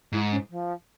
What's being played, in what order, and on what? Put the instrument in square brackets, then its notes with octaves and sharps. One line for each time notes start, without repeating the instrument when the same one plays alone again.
[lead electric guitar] G#2 [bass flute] E4
[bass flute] C#4
F3